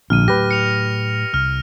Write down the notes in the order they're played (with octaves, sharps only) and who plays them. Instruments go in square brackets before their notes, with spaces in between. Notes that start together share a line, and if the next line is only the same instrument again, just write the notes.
[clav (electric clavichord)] A#1 [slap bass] D3 C4 [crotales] F6 D#7
[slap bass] A2 F#3 A3 [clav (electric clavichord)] G4 B4 [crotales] A#6
[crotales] C#7 F7
[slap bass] C2 [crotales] F6